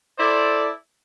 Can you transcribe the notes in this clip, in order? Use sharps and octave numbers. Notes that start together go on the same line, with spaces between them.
E4 A4 C5 D5